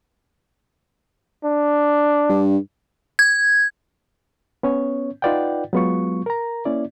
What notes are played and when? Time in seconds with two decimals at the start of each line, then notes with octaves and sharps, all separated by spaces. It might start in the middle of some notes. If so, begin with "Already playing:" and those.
1.44 D4
2.29 G2
3.19 G#6
4.63 B3 C#4 C#5
5.22 D#4 F4 B4 D5 F#5 G5
5.73 F#3 G#3 B3 F4 C#6
6.26 A#4 A#5
6.65 A#3 C#4 E4 D5